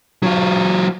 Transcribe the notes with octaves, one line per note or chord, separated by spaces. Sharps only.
F#3 F4